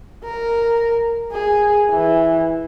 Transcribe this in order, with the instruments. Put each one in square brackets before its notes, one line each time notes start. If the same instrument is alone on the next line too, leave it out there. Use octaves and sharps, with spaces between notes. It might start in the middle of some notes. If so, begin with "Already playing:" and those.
[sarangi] A#4
G#4
E3